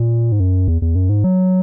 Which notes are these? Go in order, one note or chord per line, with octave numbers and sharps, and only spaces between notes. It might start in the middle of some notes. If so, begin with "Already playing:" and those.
Already playing: A#2
G#2
F#2
E2
E2
F#2
G#2
F#3